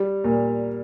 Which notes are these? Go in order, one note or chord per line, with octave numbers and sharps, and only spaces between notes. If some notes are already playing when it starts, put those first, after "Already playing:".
Already playing: G3
A#2